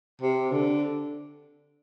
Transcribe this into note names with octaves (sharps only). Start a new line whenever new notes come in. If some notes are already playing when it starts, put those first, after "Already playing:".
C3
D3